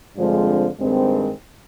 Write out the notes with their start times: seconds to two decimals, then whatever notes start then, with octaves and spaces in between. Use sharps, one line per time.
0.17 G2 D3 F3 G#3 C4
0.79 G2 D#3 G#3 C4